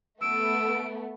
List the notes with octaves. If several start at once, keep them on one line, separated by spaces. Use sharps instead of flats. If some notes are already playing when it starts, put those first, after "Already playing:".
A3 B3 E6 D7